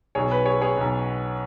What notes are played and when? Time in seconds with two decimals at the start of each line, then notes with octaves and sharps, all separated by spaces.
0.15 B1 B2 G#4 C#5
0.31 B4
0.46 G#4 C#5
0.61 G#4 C#5
0.76 B1 B2